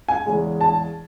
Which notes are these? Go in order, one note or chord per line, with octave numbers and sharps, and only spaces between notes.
G#5
E2 C#3 G#3
A5